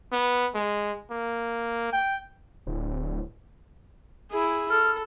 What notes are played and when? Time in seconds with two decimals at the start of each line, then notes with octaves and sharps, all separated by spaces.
0.12 B3
0.55 G#3
1.11 A#3
1.93 G5
2.67 D1
4.30 E4 G#4
4.70 A4 F6